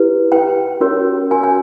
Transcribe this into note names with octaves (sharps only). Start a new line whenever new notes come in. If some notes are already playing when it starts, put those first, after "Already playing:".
Already playing: E4 G4 B4
E4 G4 B4 G5
C#4 F#4 A#4 C#5
C#4 F#4 A#4 C#5 G#5
G#5